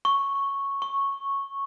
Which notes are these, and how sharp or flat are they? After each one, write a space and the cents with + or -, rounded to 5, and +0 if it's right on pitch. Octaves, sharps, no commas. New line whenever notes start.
C#6 -5
C#6 -10